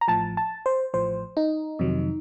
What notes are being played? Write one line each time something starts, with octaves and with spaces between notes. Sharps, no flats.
A#5
A1 A2 F3 A5
A5
C5
A1 A2 F3 C5
D#4
F2 C3 D#3 F#3